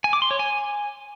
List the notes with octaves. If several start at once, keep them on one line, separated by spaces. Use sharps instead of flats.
G#5
D6
C6
C#5
G#5